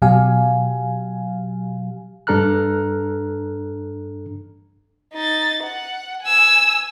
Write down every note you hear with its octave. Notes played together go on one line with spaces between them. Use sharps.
B2 F#3 G4 F5 G#5
G2 D4 A4 A#5 F6 F#6
D#4 A6
F#5
G#5 E6